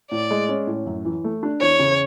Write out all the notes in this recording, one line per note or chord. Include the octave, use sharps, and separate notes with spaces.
A2 D5
G#3
C#4
A2
F#2
E3
A3
D4
E2 C#5
C#3